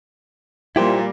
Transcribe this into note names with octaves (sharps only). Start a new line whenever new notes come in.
A#2 G3 A#3 E4 G4 C5